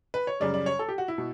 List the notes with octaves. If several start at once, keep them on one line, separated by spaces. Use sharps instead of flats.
B4
C#5
F#2 C#3 G3 D5
D5
C#5
A4
G4
F#4
E4
B2